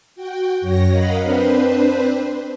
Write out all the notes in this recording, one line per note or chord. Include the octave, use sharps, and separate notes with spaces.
F#4 G5
F#2 C#5 A#6
A#4 D#5 F5 F#5 B5
C4 D4 B4 C5